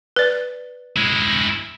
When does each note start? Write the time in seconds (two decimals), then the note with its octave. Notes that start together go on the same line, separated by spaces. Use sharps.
0.16 B4 D5
0.96 G#3 E4